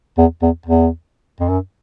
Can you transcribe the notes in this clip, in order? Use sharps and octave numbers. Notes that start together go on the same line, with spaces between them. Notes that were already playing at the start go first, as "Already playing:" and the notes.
E2
E2
E2
F2
F#2